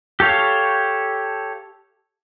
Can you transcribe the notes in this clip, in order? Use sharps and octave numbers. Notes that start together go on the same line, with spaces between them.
G4 A4 C#5 F5